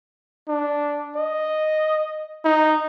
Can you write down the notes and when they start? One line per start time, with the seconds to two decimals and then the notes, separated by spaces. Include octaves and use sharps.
0.48 D4
1.16 D#5
2.45 D#4